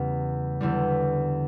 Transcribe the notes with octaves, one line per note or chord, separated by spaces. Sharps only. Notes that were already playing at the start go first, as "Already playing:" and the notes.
Already playing: E2 C#3 G3
E2 D3 G3